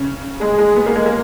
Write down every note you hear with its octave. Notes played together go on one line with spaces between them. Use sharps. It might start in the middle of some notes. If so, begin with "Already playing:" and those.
Already playing: C#3
G#3 G#4
G#3
B3
A#3
G#3
A#3